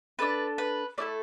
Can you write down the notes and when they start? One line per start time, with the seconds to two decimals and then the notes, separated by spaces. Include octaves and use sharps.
0.19 D4 A4 B4
0.58 B4
0.98 A3 E4 A4 D5